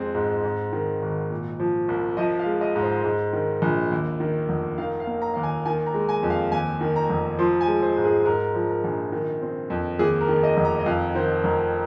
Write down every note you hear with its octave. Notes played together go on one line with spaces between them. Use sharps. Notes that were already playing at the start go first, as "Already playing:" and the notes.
Already playing: F2 G#3 C4
G#2
G#2
D#3
G#1
A#2
F3
C2
F3 D#5
F5
G#3
D#5
G#2
C5
G#2
D#3
A#1
D#2
D#3
F1
D#3 F5
F5
A#3
A#5
D#2 F5
G#5
D#3 G#5
A#5
G#3
G#5
F2
F5
D#2 G#5
D#3
A#5
F1
F3 C6
G#5
G#3
C5
G#2
G#4
G#2 A#4
F3
A#4
A#1
D#3
C4
F2
D#2 G#4
A#4
D#3
D#5
F1
A#5
D#5
F2 F5
D#3 C5
F1 A#4